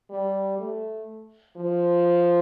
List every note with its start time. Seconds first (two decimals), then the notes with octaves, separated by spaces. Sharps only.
0.10 G3
0.59 A3
1.57 F3